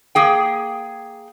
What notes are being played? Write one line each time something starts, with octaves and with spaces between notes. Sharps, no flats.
A#3 G#4 G5